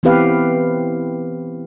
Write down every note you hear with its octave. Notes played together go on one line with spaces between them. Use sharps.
E3 B3 C4 G4 B4 F5